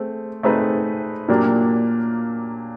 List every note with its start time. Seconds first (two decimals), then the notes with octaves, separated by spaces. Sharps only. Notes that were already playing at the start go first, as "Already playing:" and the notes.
Already playing: A3 C4 G#4
0.43 A3 C4 D#4 G#4 B4
1.28 A#2 F#3 A#3 D4 G4